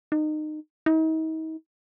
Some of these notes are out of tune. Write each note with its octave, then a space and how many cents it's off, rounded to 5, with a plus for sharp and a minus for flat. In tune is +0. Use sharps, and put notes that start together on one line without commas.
D#4 -25
D#4 +40